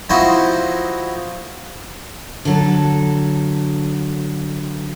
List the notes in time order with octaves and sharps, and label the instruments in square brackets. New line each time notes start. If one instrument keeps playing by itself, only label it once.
[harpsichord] F3 C4 D#4 E4 F#4
[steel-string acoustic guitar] D3 F#3 A4